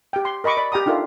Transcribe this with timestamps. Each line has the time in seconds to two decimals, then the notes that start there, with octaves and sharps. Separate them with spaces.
0.13 G4 G5
0.25 C6
0.44 A#4 D#5 B5 C#6 D6
0.57 D5 B5
0.72 G4 G5 A#5 D#6
0.86 D4 D#4 F4 A4 A#4 E5